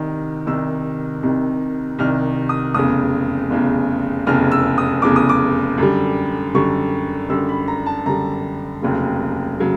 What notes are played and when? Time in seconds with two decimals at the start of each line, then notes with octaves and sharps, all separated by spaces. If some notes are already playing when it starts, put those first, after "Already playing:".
Already playing: C2 C3 D#3
0.47 C2 C3 D#3 E6
1.23 C2 C3 D#3
1.99 C2 C3 D#3 F6
2.49 D#6
2.74 F1 E2 C#3 D#6
3.50 F1 E2 C#3
4.27 F1 E2 C#3 F6
4.52 E6
4.78 D#6
5.02 F1 E2 C#3 D6
5.16 D#6
5.29 D6
5.78 F#2 D3 G3
6.54 F#2 D3 G3 C#6
7.29 F#2 D3 G3 E6
7.49 B5
7.68 A#5
7.86 A5
8.05 F#2 D3 G3 A#5
8.82 F1 D#2 C#3 F#3
9.60 C#3 F#3